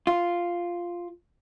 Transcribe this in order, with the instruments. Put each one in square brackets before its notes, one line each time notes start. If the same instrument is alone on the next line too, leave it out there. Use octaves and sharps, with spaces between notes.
[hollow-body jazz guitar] F4